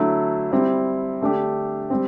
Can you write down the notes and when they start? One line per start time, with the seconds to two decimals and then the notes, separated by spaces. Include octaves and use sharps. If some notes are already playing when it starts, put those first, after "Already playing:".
Already playing: D3 F#3 A3 E4
0.51 G3 C4 E4
1.21 D3 A3 D4 G4
1.90 G3 C4